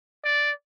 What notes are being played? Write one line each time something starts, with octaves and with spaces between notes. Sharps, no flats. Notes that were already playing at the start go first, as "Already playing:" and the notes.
D5